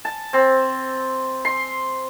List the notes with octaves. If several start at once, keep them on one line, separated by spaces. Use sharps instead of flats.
A5
C4
C6